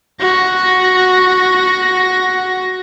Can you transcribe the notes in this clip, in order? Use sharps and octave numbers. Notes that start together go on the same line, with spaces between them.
F#4 A#6